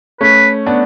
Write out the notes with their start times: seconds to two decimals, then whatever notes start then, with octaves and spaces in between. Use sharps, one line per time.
0.21 A3 C#4 B4
0.67 B3 D4